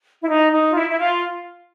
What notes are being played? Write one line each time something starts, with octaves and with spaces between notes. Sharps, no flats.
E4
D#4
D#4
F4
E4
E4
F4